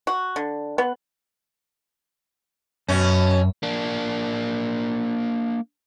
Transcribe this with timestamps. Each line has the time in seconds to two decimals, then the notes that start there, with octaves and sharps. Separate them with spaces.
0.07 F#4
0.36 D3
0.78 B3
2.88 F#2 B2 C#4
3.63 A#3 D4